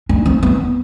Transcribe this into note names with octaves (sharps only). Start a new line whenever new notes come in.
D4
C4
B3